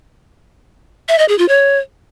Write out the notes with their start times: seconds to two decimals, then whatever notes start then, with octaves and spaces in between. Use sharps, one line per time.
1.09 E5
1.19 D#5
1.29 G#4
1.38 F4
1.48 C#5